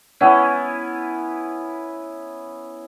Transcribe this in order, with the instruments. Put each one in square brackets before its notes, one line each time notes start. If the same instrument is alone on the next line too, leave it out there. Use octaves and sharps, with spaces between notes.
[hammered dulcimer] B3 C#4 E4